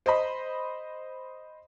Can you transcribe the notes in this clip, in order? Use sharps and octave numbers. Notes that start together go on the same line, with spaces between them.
C5 D#5 B5